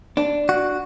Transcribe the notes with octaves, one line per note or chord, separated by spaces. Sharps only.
D4
F#4